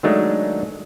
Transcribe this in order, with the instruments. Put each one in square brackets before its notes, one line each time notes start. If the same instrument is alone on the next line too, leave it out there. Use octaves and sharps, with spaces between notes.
[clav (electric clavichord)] D#3 F#3 G#3 A3 D4 D#4